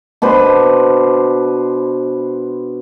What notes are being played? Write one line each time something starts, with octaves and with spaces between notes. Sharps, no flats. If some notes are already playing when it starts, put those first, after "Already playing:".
B2 D4 B4 C5